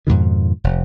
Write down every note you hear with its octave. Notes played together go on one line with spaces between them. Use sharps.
F2 G#2 B2 D#3
F1